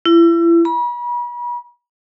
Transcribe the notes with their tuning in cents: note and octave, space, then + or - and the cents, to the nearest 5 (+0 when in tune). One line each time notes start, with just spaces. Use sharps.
E4 +35
B5 -40